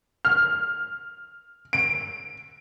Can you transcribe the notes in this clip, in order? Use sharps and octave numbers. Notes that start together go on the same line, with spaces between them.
F6
D7